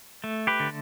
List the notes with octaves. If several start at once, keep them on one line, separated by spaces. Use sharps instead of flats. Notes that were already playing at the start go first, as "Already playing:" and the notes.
A3
G4 B4
D3